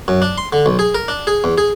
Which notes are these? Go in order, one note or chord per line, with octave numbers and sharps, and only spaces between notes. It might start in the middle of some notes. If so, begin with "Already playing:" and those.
F#2
D4
C6
D3
B1
G#4
A#4
D4
G#4
E2
G#4